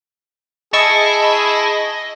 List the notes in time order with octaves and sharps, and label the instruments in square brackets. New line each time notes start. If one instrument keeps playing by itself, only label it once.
[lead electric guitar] E4 [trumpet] G#4 [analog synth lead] D#5 [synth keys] A5 C#6 E6